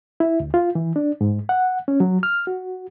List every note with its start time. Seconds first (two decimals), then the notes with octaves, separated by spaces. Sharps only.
0.20 E4
0.40 D2
0.54 F4
0.75 E3
0.96 D4
1.21 G#2
1.49 F#5
1.88 C#4
2.00 F#3
2.23 F6
2.47 F#4